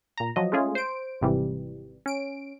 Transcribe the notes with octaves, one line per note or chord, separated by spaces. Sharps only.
A#2 A#5
F3 F#3 D#5
G#3 A3 C#4 F4 G#4
C5 D7
G#1 G#2 C3 E3 G3
C#4 D7